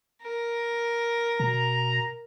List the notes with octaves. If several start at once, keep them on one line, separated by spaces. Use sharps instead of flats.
A#4
B2 A#5